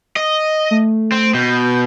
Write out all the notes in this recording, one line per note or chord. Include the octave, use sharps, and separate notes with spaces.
D#5
A3
C4
B2 G6